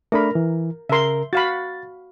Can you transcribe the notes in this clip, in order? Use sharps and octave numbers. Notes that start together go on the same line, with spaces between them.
A3 D4 A#4 B5
E3
C#3 A#4 E5 C6
F#4 F5 B5 A6